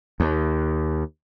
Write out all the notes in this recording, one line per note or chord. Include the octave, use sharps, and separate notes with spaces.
D#2